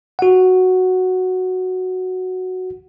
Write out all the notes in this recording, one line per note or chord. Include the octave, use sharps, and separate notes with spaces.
F#4 F#5